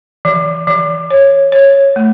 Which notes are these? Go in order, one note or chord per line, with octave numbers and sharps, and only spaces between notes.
E3
E3
C#5
C#5
A3